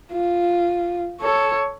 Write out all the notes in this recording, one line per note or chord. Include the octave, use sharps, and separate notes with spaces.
F4
A4 C#5